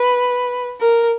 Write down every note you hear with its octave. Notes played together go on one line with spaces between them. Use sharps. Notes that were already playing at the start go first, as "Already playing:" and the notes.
Already playing: B4
A#4